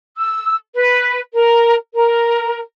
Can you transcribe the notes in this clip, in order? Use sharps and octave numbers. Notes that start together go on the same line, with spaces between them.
E6
B4
A#4
A#4